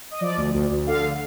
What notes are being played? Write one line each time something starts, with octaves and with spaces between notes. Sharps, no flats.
D#5
F3 D5
D2
D2
D2
D3 F5